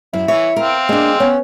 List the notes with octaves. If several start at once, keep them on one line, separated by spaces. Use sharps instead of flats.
F#2 E4
E3 C#5 E5
C4 A#4 F5
G#3 A#3 D4
B3 C#4 C#5